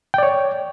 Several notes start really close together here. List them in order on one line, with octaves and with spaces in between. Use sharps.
G5 D5 C#5